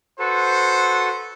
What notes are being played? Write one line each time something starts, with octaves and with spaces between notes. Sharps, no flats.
F#4 A4 B4 C5